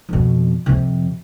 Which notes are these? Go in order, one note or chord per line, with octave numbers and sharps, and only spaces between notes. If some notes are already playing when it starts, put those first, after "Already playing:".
F2 B2
F2 C3